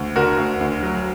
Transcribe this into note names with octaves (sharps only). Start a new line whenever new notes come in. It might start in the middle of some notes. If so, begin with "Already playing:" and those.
Already playing: D2
D3 F#4 A#4
D2
D2
F#3